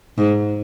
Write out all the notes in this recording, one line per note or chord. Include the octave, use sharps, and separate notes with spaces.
G#2